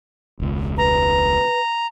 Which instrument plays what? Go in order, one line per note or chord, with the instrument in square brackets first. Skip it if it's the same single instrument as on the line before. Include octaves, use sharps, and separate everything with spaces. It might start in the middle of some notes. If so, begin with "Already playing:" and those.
[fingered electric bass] E1 C#2
[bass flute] B4 [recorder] A#5